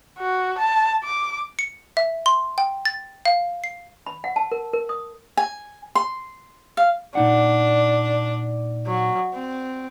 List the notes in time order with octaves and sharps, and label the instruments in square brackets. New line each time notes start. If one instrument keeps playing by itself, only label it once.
[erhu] F#4
A5
D6
[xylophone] C#7
E5
C6
G5
A6
F5
C7
[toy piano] B5
F#5
A5
A#4
A#4
D#6
[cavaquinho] G#5
C6
F5
[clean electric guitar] A#2 D#4 F#5 [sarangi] D4
[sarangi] F#3
C4